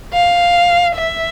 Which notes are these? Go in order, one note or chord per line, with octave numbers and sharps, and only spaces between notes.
F5
E5